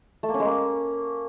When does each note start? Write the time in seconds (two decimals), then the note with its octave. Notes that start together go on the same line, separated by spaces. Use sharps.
0.23 A3
0.29 A#3
0.34 C#4
0.40 G#3
0.45 A#3